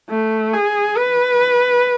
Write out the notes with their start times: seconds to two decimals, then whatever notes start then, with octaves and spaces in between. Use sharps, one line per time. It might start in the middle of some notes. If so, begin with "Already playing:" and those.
0.10 A3
0.54 G#4
0.97 B4